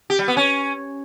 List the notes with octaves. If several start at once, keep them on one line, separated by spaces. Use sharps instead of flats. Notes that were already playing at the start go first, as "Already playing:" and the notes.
G4
G3
B3
C#4